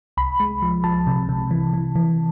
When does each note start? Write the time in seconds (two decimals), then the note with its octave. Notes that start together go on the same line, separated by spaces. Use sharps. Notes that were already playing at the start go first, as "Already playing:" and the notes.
0.17 C2 B5
0.40 G#3
0.62 F3
0.84 F3 A5
1.07 C3
1.29 C3
1.51 E3
1.74 E3
1.96 E3